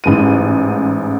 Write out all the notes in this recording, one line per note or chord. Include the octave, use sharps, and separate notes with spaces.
A1 G#2 D#7